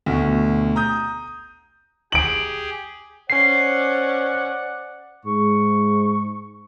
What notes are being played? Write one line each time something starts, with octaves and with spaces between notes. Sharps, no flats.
D2 B2
A#5 D#6 G6
G4 G#4 D7 F#7
C#4 C5 D5 F#5 C7
G#2 C#6